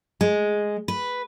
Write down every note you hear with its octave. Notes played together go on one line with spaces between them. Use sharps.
G#3
B4